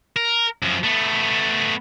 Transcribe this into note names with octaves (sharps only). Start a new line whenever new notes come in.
A#4
F#2 F3
A3 B3